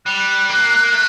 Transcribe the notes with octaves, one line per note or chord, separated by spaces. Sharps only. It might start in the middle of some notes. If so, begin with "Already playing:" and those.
G3 F#6
A#3
A3